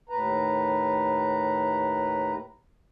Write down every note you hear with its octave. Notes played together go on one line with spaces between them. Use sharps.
D#2 A2 B4 A#5